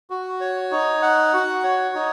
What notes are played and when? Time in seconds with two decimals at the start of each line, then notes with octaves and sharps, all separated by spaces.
0.10 F#4
0.41 C#5
0.71 D#4
1.02 F#5
1.33 F#4
1.64 C#5
1.95 D#4